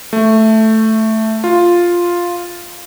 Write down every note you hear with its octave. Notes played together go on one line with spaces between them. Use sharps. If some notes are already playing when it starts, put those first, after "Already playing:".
A3
F4